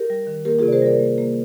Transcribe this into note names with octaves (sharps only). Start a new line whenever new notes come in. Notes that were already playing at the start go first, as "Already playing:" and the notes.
Already playing: G4 A#4
G3
D#3
A#3 G4 A#4
C3 F4 G#4
D5
G#4 C5
G3 A#4 D5
A#3
A#3